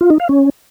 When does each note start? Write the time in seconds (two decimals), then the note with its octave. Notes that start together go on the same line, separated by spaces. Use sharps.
0.01 F4
0.10 D#4
0.20 F5
0.29 C#4